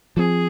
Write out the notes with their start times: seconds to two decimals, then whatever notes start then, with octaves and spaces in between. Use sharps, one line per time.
0.17 F3 C4 G#4